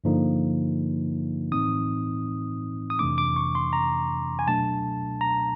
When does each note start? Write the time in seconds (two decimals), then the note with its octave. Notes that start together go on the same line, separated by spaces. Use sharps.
0.04 G2 D3 F3 A#3 D#4
1.52 A2 E3 A3 C4 D#4 D#6
2.90 D#6
2.99 F2 C3 E3 A3 D4 D6
3.18 D6
3.36 C#6
3.55 C6
3.73 A#5
4.39 G#5
4.47 B2 F#3 A3 D4 A5
5.21 A#5